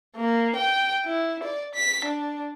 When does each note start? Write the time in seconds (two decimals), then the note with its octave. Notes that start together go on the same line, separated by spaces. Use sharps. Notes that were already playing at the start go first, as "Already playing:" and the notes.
0.16 A#3
0.56 G5
1.05 E4
1.44 D5
1.75 B6
2.05 D4